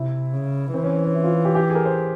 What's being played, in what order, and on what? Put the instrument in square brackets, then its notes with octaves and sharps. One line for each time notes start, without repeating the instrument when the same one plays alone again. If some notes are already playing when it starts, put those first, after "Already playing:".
Already playing: [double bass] C3 [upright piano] E4
[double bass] C#3
[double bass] E3 [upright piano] C4
[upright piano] C#4
C#4
E4
F4
G4
G4
G#4
A#4
C5